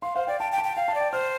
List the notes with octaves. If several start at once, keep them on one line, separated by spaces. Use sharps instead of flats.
F5 C6
C5 F5
D5 G5
G5 A5
G5
A5
G5
F5 G5
A5
D5
G5
C5 F6